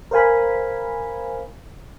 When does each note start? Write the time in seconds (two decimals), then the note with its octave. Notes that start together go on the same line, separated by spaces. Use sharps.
0.11 A#4 C5 F5 G#5 B5